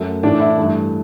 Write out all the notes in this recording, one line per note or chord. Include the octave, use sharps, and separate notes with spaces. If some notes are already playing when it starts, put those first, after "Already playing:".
Already playing: F#2 F#3 A3
A2 E3 A3 D4
E4
G2 E3 A3